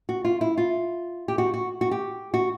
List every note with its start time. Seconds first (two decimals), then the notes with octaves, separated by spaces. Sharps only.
0.09 F#4
0.25 F4
0.41 E4
0.58 F4
1.28 G4
1.38 F#4
1.54 F#4
1.81 F#4
1.91 G4
2.34 F#4